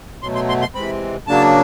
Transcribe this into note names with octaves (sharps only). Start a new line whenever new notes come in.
B2 F#3 A3 C6
C6
C6
C6
C3 E3 G#3 C4 B5
C#3 F#3 A#3 D4 A5